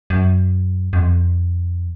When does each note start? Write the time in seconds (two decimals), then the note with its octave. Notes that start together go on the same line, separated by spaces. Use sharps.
0.10 F#2
0.93 F#2
0.96 F2